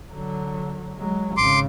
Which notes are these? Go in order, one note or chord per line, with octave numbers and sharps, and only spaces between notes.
D3 F#3
F#3 G#3
G#1 C#3 C6 D6